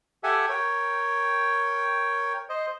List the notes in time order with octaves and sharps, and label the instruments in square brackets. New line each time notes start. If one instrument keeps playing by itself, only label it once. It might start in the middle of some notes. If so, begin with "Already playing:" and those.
[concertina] G4 A4 E5 F#5 G#5
A#4 C#5 G5
C5 D#5